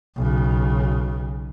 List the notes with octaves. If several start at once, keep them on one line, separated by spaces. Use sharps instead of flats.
B1 C#3